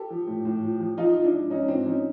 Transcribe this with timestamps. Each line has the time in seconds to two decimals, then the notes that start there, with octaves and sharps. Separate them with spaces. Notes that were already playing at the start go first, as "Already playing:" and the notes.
Already playing: G4 A4
0.10 F3
0.27 A2
0.45 A2
0.62 F3
0.80 F3
0.98 F3 D#4 F4
1.15 F3
1.24 D4 E4
1.33 G#2
1.50 G#2 C#4 D#4
1.68 F3 C4 D4
1.86 F3 C#4 D#4